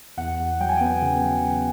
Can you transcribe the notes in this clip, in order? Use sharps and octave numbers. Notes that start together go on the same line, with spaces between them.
E2 F#5
E2
F#3 G5
G#5
B3 G5
C#3
F#3
C#3